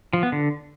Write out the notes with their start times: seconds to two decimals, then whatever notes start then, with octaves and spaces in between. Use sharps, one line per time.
0.13 F3
0.23 B3
0.32 D3